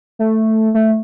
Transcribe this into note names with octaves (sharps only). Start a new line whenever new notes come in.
A3
A3